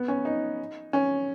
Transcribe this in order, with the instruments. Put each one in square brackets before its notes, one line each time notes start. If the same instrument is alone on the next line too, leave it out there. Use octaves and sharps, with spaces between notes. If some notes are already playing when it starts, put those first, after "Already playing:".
Already playing: [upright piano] B3
C#4
D#4
C#4